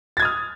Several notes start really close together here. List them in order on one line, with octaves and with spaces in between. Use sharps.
A6 G#6 D#6 F6